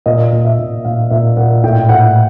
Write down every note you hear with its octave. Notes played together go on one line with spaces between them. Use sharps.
A#2 D#5
A#2
E5
A#2
A#2 F5
A#2 E5
A#2 F#5
A2 G5
A2 F#5